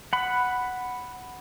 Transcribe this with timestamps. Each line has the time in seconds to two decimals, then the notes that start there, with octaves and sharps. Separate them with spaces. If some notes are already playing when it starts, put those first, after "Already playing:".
0.13 F#5 B5